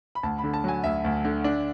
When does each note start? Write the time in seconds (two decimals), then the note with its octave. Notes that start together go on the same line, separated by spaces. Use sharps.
0.15 B5
0.23 D2 A5
0.39 B5
0.44 D3
0.54 A5
0.64 F#3 G#5
0.84 D2 E5
1.04 D2
1.25 D3
1.44 D4